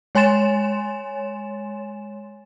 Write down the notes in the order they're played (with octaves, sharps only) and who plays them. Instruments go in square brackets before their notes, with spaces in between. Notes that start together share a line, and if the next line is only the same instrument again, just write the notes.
[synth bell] G#3 C#5 G#5 C6 A6 E7